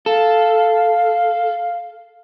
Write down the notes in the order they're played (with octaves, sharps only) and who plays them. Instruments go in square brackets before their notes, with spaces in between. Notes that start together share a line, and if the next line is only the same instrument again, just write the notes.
[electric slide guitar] A4 [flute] F5